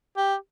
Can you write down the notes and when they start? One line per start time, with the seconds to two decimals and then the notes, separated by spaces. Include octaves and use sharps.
0.17 G4